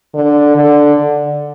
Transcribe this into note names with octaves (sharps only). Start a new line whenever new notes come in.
D3
D3